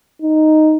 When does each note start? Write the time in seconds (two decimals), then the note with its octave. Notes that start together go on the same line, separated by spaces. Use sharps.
0.22 D#4